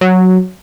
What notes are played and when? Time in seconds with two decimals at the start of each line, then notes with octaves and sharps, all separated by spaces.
0.01 F#3